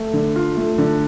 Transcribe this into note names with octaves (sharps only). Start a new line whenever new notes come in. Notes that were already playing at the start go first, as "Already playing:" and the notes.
Already playing: A3
D3
F4
A3
D3